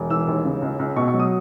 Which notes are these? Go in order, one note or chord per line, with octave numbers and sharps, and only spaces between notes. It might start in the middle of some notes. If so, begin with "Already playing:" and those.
Already playing: E1
E3 E6
D#2
C#3
C#2
C#2
B2 C#6
C#6
F#3
D#6